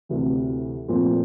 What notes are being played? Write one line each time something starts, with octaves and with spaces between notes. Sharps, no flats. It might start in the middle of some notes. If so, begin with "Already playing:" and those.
D2 C3 E3
A#2 F3 A3 C4